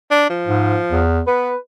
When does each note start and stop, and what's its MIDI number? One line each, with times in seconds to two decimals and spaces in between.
0.11 0.28 62
0.30 1.02 53
0.47 0.76 44
0.91 1.22 40
1.27 1.51 59
1.27 1.57 71